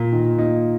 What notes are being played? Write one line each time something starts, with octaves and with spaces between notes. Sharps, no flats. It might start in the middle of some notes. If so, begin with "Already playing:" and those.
Already playing: A#2 A#3
D#3
D#4